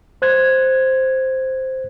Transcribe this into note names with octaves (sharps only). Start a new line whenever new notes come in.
C5 F#6 G#6